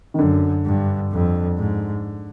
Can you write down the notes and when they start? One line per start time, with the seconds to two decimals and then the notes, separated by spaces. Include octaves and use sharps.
0.14 D#3
0.19 F#2 D3
0.65 G2
1.12 F2
1.58 G#2